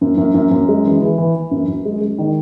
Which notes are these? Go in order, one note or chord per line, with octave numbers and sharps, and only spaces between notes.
F#2
F#2
F#2
F#2
G#3
E3
E3
E3
E3
F#2
F#2
G#3
G#3
D#3